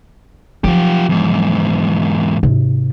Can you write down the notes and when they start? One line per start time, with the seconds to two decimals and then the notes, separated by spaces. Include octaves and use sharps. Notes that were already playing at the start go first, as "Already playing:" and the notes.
0.64 F3 F#3 F4 G4
1.09 E2 G#2
2.43 G#2 C3